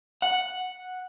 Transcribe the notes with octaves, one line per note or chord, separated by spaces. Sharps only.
F#5